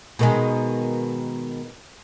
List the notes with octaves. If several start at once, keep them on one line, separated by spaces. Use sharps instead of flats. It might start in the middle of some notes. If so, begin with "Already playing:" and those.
B2 D#3 G#3